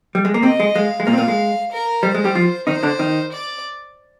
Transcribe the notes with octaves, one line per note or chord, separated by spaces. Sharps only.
G3
G#3
A#3
C3 C4 D#5
G#3
G#3 F5
G#3
A#2 A#3 F5
C4
A#2 A#3
G#3
A#4
G3 C5
G#3
G3 G4
F3 F4
D#3 D#4 C5
D3 D4
D#3 D#4
D5